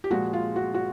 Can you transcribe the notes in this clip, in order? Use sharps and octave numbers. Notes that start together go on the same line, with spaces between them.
G4
A#2 F3 G#3 F#4
F4
F#4
F#4